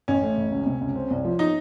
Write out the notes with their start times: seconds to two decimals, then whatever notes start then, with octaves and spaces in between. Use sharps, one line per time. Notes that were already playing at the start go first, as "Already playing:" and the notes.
0.08 A1 C#4
0.22 A3
0.37 A1
0.52 C#2
0.66 C3
0.81 C#2
0.96 C4
1.10 C2
1.25 F3
1.39 D#4